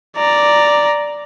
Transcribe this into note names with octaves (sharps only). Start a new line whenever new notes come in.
D5 A#5